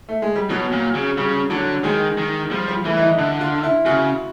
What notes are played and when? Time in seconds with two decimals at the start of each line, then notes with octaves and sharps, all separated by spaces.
0.09 A3
0.22 G#3
0.36 G3
0.50 B2 F#3
0.72 A#2
0.95 C#3
1.17 C#3 G3
1.50 D3 F#3
1.84 D#3 G#3
2.18 D#3
2.51 F3 G3
2.68 G3
2.85 E3 A3
2.97 E4
3.01 D#4
3.18 D3 E4
3.41 F4
3.63 E4
3.86 C#3 F#4